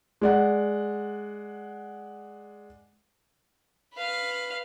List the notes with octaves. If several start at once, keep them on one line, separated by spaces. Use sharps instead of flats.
G#3 D5 F#5
B4 F5